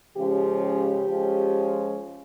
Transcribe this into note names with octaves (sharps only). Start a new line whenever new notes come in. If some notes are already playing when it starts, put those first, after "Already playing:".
C#3 F3 G#3 C#4 G4
G4
F3 G#3 C#4